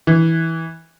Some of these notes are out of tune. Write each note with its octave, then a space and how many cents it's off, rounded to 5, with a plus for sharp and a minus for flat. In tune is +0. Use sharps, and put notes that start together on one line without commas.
E3 -15